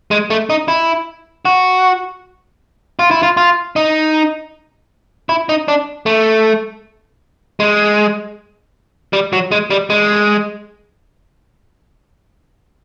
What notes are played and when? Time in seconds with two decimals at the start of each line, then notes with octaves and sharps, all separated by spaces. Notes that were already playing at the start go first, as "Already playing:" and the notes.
0.11 G#3
0.30 A3
0.50 D#4
0.68 E4
1.45 F#4
2.99 F4
3.11 E4
3.23 F4
3.37 F4
3.76 D#4
5.29 E4
5.49 D#4
5.68 D4
6.06 A3
7.60 G#3
9.13 G3
9.33 F#3
9.52 G#3
9.70 G3
9.90 G#3